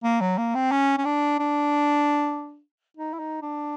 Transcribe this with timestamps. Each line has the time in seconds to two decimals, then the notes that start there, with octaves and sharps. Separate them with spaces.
0.04 A#3
0.21 F#3
0.38 A#3
0.55 C4
0.72 C#4
0.98 C#4
1.05 D4
1.39 D4
2.97 D#4
3.14 E4
3.19 D#4
3.42 D4